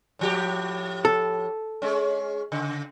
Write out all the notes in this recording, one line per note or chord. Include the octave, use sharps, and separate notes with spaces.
A2 F3 G4
A4
G#3 C#4
C#3